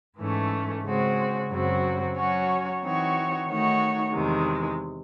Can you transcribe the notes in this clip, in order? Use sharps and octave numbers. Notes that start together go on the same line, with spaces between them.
G#2 E3 A3 C#4
C#3 G#3 C4 F#4
F#2 C#3 F#3 C4 F#4
F#3 C#4 F#4 C#5
E3 C4 D#4 F#4 C#5
D#3 A3 D#4 F#4 C#5
E2 C3 D#3 G#3